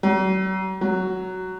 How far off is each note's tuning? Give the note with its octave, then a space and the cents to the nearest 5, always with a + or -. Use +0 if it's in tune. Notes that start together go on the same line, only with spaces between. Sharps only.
F#3 +40
F#3 +5